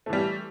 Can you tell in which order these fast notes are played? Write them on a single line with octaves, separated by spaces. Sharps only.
A3 E3 G3